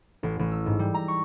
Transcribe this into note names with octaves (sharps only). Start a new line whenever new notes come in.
A1
A1
E6
G#2
G3
A#5
C#6